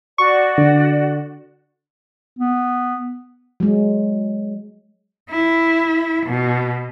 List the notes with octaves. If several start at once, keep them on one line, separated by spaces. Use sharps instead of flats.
F#4 D5 C#6
D3
B3
F#3 G#3
E4
B2